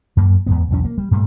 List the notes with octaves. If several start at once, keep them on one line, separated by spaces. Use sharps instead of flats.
F#2 A#3
E2 G#2 B3
B1 E2 F#3 C#4
A#3
G3
G2 A#2 G3 A3